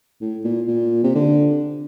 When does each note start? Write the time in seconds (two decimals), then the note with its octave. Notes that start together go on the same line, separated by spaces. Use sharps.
0.21 A2
0.44 A#2
0.68 A#2
1.04 C3
1.15 D3